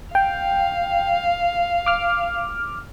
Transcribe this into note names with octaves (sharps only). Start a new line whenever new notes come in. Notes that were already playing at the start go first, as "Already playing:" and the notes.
F5 G5
D6 F6